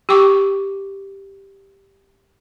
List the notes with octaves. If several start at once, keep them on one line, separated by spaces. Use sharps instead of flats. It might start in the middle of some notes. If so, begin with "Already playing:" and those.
G4 G5 C#6 D6